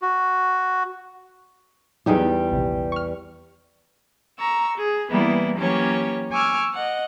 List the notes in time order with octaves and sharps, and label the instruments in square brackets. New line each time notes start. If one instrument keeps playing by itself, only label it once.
[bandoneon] F#4
[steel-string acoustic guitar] E2 G3 G4 [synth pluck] F#3 D#4 G#4
[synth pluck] A#1 C3
C#6 F6
[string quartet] A#5 C#6 E6
G#4
E3 G3 A#3 B3 E4
E3 F#3 A#3 C#4 G4 C#5
G#5 C#6 D6 E6 F6 G#6
D#5 F#5